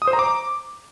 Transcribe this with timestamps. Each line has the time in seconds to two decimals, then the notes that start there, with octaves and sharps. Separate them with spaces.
0.02 D#6
0.07 C5
0.13 A#5
0.19 D6